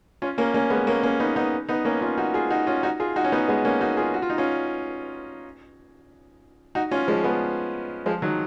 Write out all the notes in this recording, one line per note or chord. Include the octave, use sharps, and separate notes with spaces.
C#4 F4
A#3 C#4
A#3 C#4
G#3 B3
A#3 C#4
A#3 C#4
B3 D#4
B3 D#4
B3 D#4
A#3 C#4
C#4 F4
D#4 F#4
F4 G#4
D#4 F#4
C#4 F4
D#4 F#4
F4 G#4
D#4 F#4
C#4
B3 D#4
G#3 B3
A#3 C#4
D#4 F#4
F4 G#4
F#4
F4
D#4
C#4 F4
D#4 F#4
C#4 F4
F3 G#3
G#3 B3
F3 G#3
D#3 F#3